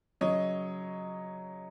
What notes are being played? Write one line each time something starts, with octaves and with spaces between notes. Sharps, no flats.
C#3 F#3 C#5 D#5